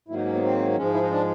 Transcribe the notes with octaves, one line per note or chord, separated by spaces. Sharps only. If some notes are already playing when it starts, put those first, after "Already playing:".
G#2 D#3 F#3 A#3 E4
D#4
C#4
B3
C4
G#2 F3 G#3 C#4
E4
D#4
D4